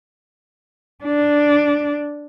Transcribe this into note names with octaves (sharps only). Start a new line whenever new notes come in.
D4